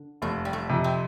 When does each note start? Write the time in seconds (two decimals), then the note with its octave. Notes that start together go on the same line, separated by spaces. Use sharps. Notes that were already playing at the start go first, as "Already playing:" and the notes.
Already playing: D3
0.22 F1 A3
0.45 G3
0.53 A3
0.69 F2 C3
0.84 C4